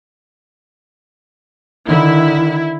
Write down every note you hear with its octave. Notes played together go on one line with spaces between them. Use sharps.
D3 D#3 E4